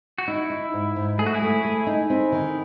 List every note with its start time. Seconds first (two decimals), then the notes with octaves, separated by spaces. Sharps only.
0.18 F#4
0.28 D#4 E4
0.50 D#4
0.73 G#2
0.96 G#2
1.18 A3 G#4
1.26 F#4
1.34 E4 G#4
1.42 A3
1.65 A3
1.87 D#4
2.10 C4
2.32 D#3